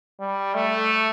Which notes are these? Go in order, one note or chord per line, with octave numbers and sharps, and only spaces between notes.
G3
A3